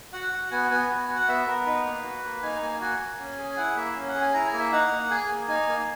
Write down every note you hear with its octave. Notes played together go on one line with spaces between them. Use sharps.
F#4 F#5
F#4
B3 G#5
B3 G#5
F#4
G#5
F#4
F#5
B3 E5
B3 A#4
D#4 B4
A#3
F#4
A#3
D#4 G#5
A#3 G#5
F#4 G#5
A#3
C#4
G#4
E4 F#5
A#3 E5
C#4
F#5
G#4
G#5
E4 A#5
G#5
A#3
E5
D#4 F#5
A#3
G#4 G#5
G#5
A#3
D#4 G#5
A#3